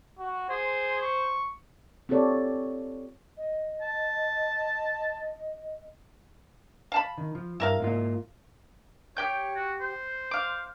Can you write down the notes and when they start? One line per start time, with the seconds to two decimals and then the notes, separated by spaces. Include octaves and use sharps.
0.19 F#4
0.49 G#4 C5
1.01 C#6
2.09 C4 F4 G4 A4 C#5 D5
3.37 D#5
3.82 A5
6.92 F5 A5 B5
7.18 D#3
7.35 F3
7.60 G2 E4 A#4 F5
7.80 G#2 A#3 F4
9.17 G4 C#5 G5 G6
9.56 F#4
9.81 C5
10.31 F5 D6